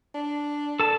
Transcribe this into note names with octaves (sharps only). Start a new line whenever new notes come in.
D4
A4 A5